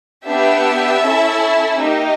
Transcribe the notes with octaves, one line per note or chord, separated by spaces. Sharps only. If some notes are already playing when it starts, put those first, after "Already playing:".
B3 D4 G4 E5
C#4 E4 A4
A#3 D#4 G4 D#5